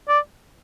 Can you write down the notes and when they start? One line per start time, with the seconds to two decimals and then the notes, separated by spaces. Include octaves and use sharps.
0.08 D5